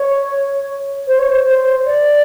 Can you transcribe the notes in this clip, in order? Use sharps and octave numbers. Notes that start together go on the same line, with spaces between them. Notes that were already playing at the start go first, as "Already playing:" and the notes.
Already playing: C#5
C5
C#5
C5
C5
D5